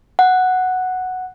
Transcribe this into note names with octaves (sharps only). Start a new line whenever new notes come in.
F#5